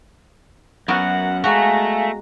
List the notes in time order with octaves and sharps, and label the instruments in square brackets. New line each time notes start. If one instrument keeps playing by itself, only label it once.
[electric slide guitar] F#2 [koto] B3 F#4 A#4 [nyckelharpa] F#5
[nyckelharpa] G#3 A#5 [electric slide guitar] A3 [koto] F#4 [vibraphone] F5 G#5